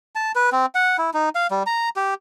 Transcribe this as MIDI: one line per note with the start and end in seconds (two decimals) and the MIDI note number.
0.15 0.32 81
0.35 0.50 71
0.52 0.66 60
0.75 0.97 78
0.98 1.10 64
1.14 1.29 63
1.35 1.47 77
1.51 1.63 55
1.66 1.89 82
1.96 2.14 67